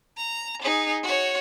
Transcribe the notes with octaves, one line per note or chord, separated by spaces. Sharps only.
A#5
D#4 G#4
F#4 C#5